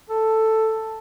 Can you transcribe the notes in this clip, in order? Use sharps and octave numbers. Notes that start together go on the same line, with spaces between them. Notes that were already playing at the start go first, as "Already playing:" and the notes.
A4